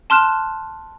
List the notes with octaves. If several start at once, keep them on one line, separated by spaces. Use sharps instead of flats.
A5 C6 F6 F#6 E7